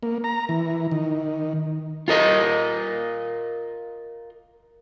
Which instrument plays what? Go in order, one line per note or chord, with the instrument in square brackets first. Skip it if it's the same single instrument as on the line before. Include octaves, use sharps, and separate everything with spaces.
[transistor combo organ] A#3
A#5
E3
D#3
[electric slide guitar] F4 A#4 D#5